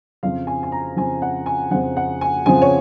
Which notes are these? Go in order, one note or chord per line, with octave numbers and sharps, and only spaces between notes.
F2 C#3 F3 F5
G#5
G#5
A#5
F2 C#3 F3 G#5
F#5
G#5
F2 C#3 F3 F#5
F#5
G#5
F2 C#3 F3 G#5
C#5